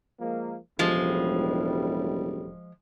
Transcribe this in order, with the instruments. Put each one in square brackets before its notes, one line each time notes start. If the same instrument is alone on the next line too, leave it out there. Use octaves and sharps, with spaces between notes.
[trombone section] F3 G#3 A#3
[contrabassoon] E1 [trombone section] C#2 A2 G3 [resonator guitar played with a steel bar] F3 G#3